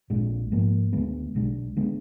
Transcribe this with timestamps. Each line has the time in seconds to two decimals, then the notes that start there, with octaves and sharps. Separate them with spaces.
0.10 A#1 A#2 G#3 D4
0.52 G#2 F3 A#3
0.93 D2 D3 G#3 B3
1.34 B1 B2 G#3 D4
1.77 D3 G#3 B3